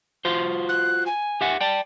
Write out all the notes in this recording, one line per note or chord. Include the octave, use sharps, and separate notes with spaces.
F4 F#4 C5
F#6
G#5
G4 E5 F#5
D5 G5 A5